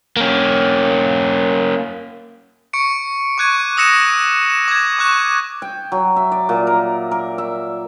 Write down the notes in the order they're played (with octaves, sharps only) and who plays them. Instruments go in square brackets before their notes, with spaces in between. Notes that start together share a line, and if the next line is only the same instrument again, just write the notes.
[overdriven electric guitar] A#3 C#4
[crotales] C#6 C#7 D7
C#6 D6 F#6 G#6 D#7
D#6 E6 A#6 C#7 E7
E7
D6 G#6
C#6 D6 F#6 E7
[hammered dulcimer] G5
F#3
E5
D5
A#2
A#4
A#4
E5